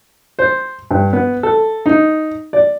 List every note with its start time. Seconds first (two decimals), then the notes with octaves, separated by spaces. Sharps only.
0.39 C5
0.91 G2
1.13 B3
1.43 A4
1.86 D#4
2.53 D5